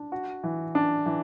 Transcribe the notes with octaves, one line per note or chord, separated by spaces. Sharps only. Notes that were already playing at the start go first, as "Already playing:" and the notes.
Already playing: D4
F#4
E3
D4
E3